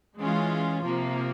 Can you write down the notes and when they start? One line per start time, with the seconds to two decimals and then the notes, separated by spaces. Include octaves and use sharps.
0.19 E3 G#3 C#4 F4
0.84 C3 F3 A#3